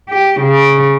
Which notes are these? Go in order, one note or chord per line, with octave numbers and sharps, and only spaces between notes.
G4
C#3